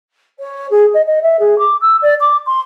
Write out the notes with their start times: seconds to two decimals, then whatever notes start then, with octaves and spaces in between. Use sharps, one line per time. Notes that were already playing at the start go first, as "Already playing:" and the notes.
0.39 C#5
0.70 G#4
0.94 D#5
1.06 D#5
1.22 E5
1.39 G#4
1.58 D6
1.81 E6
2.01 D5
2.20 D6
2.46 C6